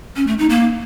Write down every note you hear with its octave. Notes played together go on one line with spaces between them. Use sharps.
C#4
A3
D#4
A#3